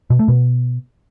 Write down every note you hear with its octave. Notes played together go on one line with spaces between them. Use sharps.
B2
A3
B2